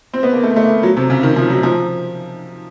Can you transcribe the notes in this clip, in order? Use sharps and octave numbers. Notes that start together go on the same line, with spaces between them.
C4
B3
A#3
A3
A3
A#3
F#3
C3
C#3
D#3
F3
F#3
F3